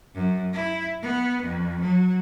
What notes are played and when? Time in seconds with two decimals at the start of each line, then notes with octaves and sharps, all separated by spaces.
0.15 F#2
0.53 E4
1.02 B3
1.43 F2
1.81 F#3